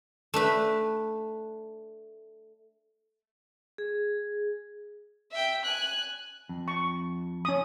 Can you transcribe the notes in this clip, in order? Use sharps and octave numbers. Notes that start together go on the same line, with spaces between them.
A3 D4 B4
G#4
E5 G5
G#5 F#6
F2
C#6
C#4 D#6